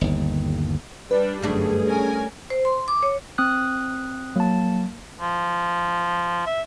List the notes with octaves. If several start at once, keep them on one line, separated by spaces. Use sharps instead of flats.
G1 D#2
G3 D4 B4
G1 F#2 G3 A3 D4 G#4
C#4 A#4 G#5
C5
C6
D6
C#5
C4 D#6 F#6
F#3 A#3 A5
F3
E5